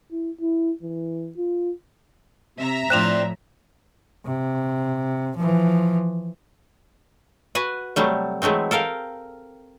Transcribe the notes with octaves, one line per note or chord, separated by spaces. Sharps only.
E4
E4
E3
F4
C3 E5 A#5
A2 F3 C4 D4 F4 F#6 E7 F7
C3
E3 F3
F#4 B4 F#5 G#5
C3 F#3 G3 A3
E3 F#3 G#3 A3 C4
A4 A#4 F5 G5